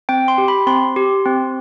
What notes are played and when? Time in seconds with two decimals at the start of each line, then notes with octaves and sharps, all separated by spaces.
0.09 C4 G5
0.28 C6
0.38 G4
0.48 B5
0.67 C4 C6
0.96 G4
1.26 C4